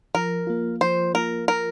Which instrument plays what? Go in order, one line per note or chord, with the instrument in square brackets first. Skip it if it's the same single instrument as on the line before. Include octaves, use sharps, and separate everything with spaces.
[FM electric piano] F3 [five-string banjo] A#4
[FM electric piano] A#3 F4
[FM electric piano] F3 [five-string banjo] C5
[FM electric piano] A#3 F4 [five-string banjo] A#4
[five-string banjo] A#4